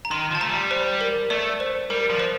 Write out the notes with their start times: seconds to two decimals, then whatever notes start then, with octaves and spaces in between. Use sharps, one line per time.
0.05 A#5
0.11 D#3 C6
0.31 F3 A5
0.41 A3 A#5
0.51 G3
0.71 C5
1.01 A#4
1.30 A3 D5
1.60 C5
1.90 G3 A#4
2.10 F3
2.20 C5